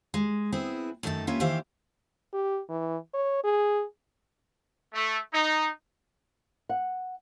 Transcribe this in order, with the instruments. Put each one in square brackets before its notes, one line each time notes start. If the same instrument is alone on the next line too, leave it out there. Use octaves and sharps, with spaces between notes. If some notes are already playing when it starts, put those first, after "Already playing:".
[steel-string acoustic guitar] G#3
B3 C4 E4 G#4
F#2 D#3 A3 D#4 A5
A#3 C#4 F4 G4 B4 E5
D#3 E3 G4 C5 E5 F5
[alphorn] G4
E3
C#5
G#4
[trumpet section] A3
D#4
[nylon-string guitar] F#5